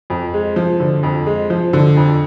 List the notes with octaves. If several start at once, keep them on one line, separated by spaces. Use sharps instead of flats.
F2
G#3
F3
D3
F2
G#3
F3
D3
F2